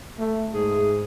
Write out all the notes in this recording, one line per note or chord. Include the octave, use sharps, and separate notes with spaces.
A3
G#2 G#4